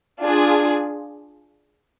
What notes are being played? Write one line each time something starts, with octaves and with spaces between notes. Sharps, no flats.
D4 F4 G#4